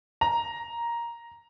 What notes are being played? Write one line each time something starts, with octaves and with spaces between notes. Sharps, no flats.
A#5